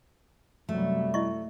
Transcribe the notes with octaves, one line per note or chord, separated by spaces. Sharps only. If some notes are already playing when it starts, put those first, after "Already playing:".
F#2 C3 F#3 G3 A3
E4 D#5 C#6